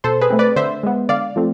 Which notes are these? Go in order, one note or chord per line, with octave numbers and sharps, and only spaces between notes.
B2 A4 C5
G#4 B4
A3 C4
B4 D5
D3 C5 E5
G#3 B3
D3 D5 F5
F3 A3 C4